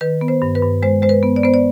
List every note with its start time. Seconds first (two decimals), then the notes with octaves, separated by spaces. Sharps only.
0.01 D#3 B4
0.21 B3
0.28 C5
0.42 G2
0.55 B4
0.62 G2
0.83 G#3 C5
1.02 G#3 C5
1.09 B4
1.23 B3
1.36 D5
1.43 B3 C5
1.54 D5